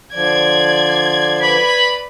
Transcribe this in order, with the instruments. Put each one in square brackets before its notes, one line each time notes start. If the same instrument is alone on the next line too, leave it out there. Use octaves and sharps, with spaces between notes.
[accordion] D3 F3 [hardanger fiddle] C5 D5 [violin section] G#6
[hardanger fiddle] B4 D5 [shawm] B5